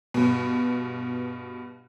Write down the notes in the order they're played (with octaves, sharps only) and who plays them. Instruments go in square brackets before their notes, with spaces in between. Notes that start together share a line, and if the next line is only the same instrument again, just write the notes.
[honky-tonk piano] G2 B2